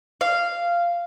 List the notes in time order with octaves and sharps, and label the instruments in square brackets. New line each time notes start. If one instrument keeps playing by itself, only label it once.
[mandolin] F5